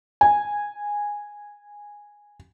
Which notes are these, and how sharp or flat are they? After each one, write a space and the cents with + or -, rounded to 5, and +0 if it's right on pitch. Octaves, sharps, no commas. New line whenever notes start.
G#5 -10